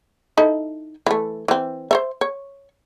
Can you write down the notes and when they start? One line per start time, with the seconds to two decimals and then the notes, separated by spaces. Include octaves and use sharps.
0.37 D#4 E4 A4
1.06 E3 A3
1.48 E3 C4
1.91 C5 C#5 E5
2.21 C#5